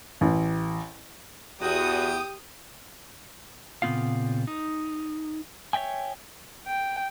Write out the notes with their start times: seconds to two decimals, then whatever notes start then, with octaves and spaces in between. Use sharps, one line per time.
0.21 A1
1.62 E2 F#4 G4 D#6
3.82 A#2 C#3 B3 C4 F4 F5
4.47 D#4
5.73 C#5 D#5 E5 G5 G#5
6.67 G5